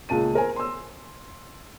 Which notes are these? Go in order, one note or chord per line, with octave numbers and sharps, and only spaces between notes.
C#2 A#2 A5 D#7
A#4 C5 G#5
C6 E6